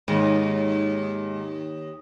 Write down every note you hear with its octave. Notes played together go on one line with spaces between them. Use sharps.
D#2 G#2